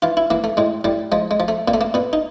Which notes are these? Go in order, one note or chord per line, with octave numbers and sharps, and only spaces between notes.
E3 F4
E4
E3 A#3
A3
A2 G#3
A2 G3
F3 G#3
G#3
F3
A3
A#2 A#3
A3
A#3
A#2 B3
D#4